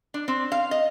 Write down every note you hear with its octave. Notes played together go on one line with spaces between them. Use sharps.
D4
C4
F5
D#5